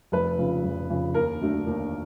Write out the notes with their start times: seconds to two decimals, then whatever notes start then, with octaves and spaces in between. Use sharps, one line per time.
0.12 F1 B4
0.38 F2 C#3
0.64 F1
0.90 F2 C#3
1.14 D#2 A#4
1.41 D3 F#3 A3 D4
1.67 D#2